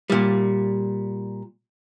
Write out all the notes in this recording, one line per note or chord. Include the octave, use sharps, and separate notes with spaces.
A#2 G3